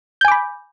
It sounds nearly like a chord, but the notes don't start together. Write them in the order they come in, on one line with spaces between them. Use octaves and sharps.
G6 G#5 D6 B5